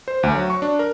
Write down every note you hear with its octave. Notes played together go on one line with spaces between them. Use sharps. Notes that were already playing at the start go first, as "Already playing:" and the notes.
C5
D2
F#3
C#6
D4
A#4